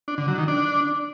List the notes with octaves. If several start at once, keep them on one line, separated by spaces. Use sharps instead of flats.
D4
D3
F#3
D#3
D4